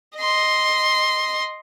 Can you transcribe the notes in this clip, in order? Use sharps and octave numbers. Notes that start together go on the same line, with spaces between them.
D#5 C6